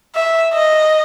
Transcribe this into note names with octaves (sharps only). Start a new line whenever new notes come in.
E5
D#5